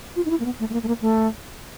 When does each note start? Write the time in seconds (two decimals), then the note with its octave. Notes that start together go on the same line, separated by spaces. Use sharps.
0.16 F4
0.25 D#4
0.30 E4
0.40 A#3
0.45 B3
0.60 A3
0.70 A3
0.73 A#3
0.83 A3
0.88 A#3
1.01 A3